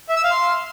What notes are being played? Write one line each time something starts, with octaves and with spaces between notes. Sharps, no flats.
E5
E6
F5
C6